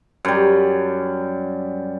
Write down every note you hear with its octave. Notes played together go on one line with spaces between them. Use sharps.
F#2 G3